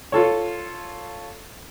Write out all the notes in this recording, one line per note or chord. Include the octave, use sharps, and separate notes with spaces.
F4 A4 C#5